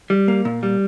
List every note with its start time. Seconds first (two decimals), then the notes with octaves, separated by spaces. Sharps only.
0.10 G3
0.28 A#3
0.45 A#2
0.63 G3